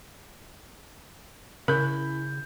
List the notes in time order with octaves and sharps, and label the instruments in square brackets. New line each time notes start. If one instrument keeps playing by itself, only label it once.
[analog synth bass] C#3 [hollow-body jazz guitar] C#4 E4 [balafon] A#4 [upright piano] B5 G6